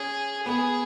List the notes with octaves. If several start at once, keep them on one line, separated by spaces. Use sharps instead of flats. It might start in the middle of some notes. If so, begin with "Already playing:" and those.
Already playing: C#4 G#4
B3 G#4